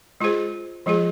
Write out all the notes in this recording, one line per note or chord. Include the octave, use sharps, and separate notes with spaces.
G#3 F4 G#4 C5
F3 G#3 F4 G#4